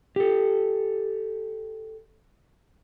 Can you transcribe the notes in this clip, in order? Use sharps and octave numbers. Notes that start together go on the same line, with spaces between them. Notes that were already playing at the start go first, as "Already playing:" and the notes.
G4 A4